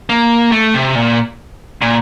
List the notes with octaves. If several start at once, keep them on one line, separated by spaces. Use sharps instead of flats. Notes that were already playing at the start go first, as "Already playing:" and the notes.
A#3
A3
C3
A#2
A#2